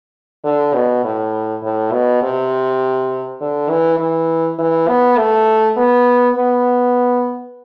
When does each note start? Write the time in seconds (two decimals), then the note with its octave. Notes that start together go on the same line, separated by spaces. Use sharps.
0.44 D3
0.74 B2
1.04 A2
1.63 A2
1.93 B2
2.23 C3
3.41 D3
3.70 E3
3.99 E3
4.59 E3
4.88 B3
5.18 A3
5.77 B3
6.36 B3